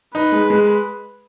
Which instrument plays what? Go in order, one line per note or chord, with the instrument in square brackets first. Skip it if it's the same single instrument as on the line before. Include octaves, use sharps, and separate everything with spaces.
[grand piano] D#4 [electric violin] B4
[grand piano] G#3
G#3